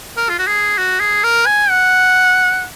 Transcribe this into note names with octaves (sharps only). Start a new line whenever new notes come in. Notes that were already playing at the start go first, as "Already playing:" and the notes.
A#4
F4
F#4
G#4
F#4
G#4
A#4
G#5
F#5